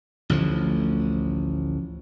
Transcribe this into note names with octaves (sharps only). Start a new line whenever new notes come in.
A1 D2 D3 F3